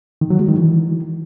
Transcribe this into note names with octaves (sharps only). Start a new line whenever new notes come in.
D#3
F#3
G#3
D#3
E3